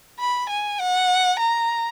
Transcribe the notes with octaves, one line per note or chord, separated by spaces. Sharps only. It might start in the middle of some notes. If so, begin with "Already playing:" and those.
B5
G#5
F#5
A#5